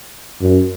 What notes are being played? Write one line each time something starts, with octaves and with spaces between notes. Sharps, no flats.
F#2